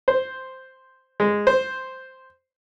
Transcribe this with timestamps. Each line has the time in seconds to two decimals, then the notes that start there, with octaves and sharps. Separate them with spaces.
0.08 C5
1.20 G#3
1.47 C5